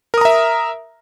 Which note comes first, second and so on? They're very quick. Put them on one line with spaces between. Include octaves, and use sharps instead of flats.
A#4 D#6 A#5 E5